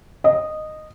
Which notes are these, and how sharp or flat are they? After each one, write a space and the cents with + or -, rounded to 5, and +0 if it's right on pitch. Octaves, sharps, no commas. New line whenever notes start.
D#5 -10